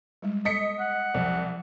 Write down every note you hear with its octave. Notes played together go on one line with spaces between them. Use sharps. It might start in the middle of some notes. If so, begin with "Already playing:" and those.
G3 G#3
D#5 B6 C#7
F#5
C2 F3 F#3